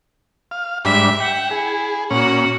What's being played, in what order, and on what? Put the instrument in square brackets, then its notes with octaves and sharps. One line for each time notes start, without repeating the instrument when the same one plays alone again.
[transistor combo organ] F5
[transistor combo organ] G#2 G3 D4 [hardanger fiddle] E5
[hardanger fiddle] E5 F#5 [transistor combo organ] G5
[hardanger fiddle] E4 [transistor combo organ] G#4
[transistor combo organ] A#2 C#4 [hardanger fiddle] F#4 F#5